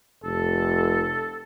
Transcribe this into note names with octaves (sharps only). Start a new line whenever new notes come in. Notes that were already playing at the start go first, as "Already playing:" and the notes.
F1 A4